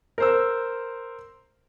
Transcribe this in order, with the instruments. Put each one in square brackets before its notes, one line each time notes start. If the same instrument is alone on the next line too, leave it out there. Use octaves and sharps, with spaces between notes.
[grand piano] A#4 C5 E6